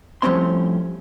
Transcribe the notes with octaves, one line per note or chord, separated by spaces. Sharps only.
A2 F3 G3 C4 C#4 C6